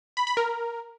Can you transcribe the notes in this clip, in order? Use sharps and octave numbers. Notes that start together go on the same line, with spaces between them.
B5
B5
A#4